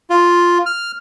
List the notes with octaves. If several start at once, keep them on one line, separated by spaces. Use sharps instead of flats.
F4
F6